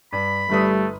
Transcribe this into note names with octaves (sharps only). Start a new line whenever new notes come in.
G2 B5
G1 G3 A3 B4 D#6